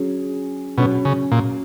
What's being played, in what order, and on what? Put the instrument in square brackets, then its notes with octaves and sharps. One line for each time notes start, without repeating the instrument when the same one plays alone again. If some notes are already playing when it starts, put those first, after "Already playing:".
Already playing: [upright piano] F#3 C#4 G#4
[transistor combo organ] B2 [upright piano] F#3 C#4 F#4
[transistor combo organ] C#3
A#2